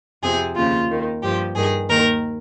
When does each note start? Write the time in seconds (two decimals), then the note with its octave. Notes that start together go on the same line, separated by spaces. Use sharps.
0.23 F2 C3 F3 G#4
0.56 D#2 C#3 F3 F4
0.90 D#2 D#3
1.22 G2 F3 G4
1.56 G2 D#3 G#4
1.90 D#2 D#3 A#4